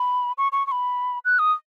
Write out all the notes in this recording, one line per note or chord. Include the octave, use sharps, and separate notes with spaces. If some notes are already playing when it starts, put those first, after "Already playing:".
Already playing: B5
C#6
C#6
C#6
B5
F#6
D#6